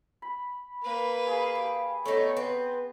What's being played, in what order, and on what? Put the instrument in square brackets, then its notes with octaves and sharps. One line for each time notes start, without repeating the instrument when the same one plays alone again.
[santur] B5
[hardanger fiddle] A#3 B4
[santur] G#4 B5 [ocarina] F5
[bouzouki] G4
[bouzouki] A3 D4 D#4 [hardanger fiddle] B3 [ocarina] C#5
[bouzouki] C4 [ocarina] B4